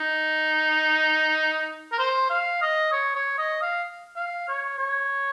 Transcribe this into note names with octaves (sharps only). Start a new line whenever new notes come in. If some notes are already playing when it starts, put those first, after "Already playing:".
Already playing: D#4
A#4
C5
F5
D#5
C#5
C#5
D#5
F5
F5
C#5
C#5